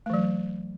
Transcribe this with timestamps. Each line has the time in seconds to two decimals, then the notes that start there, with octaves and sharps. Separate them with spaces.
0.06 A3
0.10 E3
0.14 F#3